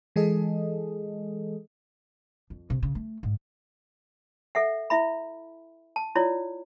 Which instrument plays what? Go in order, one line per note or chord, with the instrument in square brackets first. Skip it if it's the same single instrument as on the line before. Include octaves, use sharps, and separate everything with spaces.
[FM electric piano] E3 G#3 G#4 A4 D#5
[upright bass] F2
C3
C#3
A3
G#2
[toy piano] A4 E5 F#5
E4 E5 B5
A5
E4 F4 C#5 D5